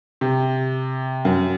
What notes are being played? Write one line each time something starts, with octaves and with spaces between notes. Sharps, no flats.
C3
F#2